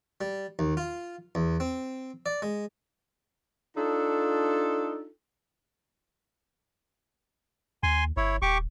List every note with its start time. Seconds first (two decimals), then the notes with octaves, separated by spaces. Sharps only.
0.21 G3
0.59 D#2
0.77 F4
1.35 E2
1.60 C4
2.26 D5
2.42 G#3
3.77 D4 D#4 F4 A4
7.83 D#2 G#5 C6
8.17 G1 E4 C#5
8.42 D#1 G4 C#6 D6